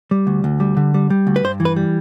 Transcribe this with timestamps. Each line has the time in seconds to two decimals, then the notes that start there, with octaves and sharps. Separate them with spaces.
0.11 G3
0.27 D2
0.44 D2
0.60 G3
0.77 D3
0.94 G3
1.10 G3
1.27 D2
1.36 B4
1.44 G2 C5
1.60 E3
1.65 B4
1.76 G3